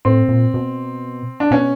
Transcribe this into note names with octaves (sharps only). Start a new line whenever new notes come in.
A2 C4
A#2
B2
D4
B2 C#4